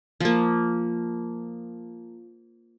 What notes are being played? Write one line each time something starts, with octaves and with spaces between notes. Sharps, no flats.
F3 A#3